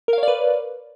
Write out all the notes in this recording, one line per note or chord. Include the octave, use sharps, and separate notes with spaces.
A#4 B4 C#5 D5 F5